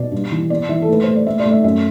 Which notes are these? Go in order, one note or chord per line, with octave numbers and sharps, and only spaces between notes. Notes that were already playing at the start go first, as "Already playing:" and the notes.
Already playing: B2 D5
G2
E3
B3 D5
E3 E5
A4
A3 B4
A3 C5
D5
A3 E5
D5
A3
E5
F#2 E5